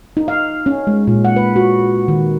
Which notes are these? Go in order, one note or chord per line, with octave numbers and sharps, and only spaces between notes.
D#4
F5
C#4
G#3
A#2
F#5
B4
F#4
D#3